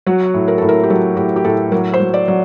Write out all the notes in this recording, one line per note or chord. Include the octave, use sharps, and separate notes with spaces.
F#3 F#4
A2
A#4
A2 A4
A#4
G4
F#3 A4
A2 G4
G4
A2 A4
F#3 A#4
C5
F#3
D5
F#3